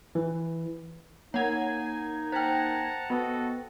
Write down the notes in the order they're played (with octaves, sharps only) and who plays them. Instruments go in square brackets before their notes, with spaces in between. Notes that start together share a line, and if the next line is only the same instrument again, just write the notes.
[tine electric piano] E3
[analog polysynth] A#3 G#6 [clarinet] D#4 [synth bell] C#5 F#5 [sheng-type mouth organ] G#5
[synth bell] C5 G5 [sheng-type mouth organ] F#5 A5 A#5
[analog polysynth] B3 [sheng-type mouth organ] F#4 A4 [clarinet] D#5